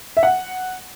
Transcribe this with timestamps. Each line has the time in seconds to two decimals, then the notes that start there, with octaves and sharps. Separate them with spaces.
0.17 E5
0.23 F#5